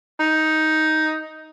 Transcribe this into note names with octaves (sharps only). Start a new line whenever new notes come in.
D#4